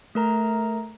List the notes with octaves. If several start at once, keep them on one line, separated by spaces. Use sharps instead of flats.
A3 A#4 A#5